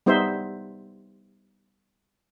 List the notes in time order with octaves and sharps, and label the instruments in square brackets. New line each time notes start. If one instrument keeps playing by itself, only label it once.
[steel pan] G3 B3 D#4 C5 E5